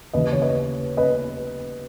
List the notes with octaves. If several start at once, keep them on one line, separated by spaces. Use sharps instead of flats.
D#2 C#3 E3 B4 D#5
C#5
B4 D#5
B4 D#5